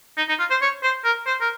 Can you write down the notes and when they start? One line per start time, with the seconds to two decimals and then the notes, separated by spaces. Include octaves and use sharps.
0.17 D#4
0.29 D#4
0.39 F4
0.50 C5
0.62 C#5
0.83 C5
1.04 A#4
1.26 C5
1.41 A#4